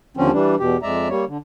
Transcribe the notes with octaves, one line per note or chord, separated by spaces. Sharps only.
D#2 D3 F3 C4 C#4
E3 G3 D4
E2 B2 G4
F2 G#3 D5 E5 A#5
G3 A#3 C#5
D3